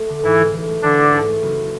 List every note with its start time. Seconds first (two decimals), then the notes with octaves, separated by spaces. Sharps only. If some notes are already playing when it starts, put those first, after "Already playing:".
Already playing: A3
0.09 D3
0.23 G#2 E3 E4
0.39 A1
0.53 E3
0.68 A3
0.82 D3 E3 D4
0.98 A1
1.13 G#2
1.27 A3
1.42 F#1